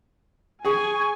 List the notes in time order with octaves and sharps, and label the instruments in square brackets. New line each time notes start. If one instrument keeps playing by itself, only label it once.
[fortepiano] G#4 [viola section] G#5 [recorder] C#6